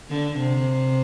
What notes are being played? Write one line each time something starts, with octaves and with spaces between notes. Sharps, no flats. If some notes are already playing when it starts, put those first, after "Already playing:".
D3
C3